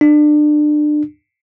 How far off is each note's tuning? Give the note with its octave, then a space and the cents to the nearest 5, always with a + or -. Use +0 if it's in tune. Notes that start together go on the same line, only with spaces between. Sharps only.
D4 +30